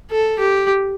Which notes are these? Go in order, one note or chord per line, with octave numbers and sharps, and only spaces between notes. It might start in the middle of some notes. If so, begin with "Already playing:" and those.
A4
G4